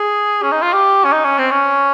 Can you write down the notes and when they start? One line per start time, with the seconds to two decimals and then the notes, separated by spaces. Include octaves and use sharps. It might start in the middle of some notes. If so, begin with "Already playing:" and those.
Already playing: G#4
0.42 C#4
0.52 D#4
0.62 F4
0.73 G4
1.05 C#4
1.12 D#4
1.25 C#4
1.38 C4
1.51 C#4